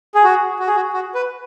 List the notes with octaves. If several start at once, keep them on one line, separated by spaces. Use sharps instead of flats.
G#4
F#4
F#4
G#4
F#4
F#4
B4